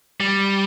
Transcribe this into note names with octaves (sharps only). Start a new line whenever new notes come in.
G3